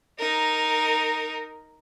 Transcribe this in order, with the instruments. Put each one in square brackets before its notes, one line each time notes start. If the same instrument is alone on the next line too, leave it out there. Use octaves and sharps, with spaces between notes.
[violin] D#4 A#4